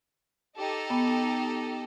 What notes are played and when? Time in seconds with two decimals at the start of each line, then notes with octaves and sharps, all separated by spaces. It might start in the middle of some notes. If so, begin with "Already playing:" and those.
0.56 D#4 G4 A4
0.90 B3